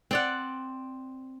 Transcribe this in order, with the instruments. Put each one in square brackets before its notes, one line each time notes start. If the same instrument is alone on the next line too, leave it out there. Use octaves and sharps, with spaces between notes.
[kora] C4 D5 F#5